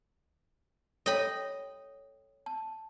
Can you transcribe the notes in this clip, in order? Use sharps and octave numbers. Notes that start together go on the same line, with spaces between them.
A4 C#5 D#5 G5 B5
A5